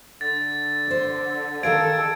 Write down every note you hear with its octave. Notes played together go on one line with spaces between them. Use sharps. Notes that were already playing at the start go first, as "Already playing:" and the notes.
D3 A6
C5 D5
D#3 A4 A#4 F5 G#6 D7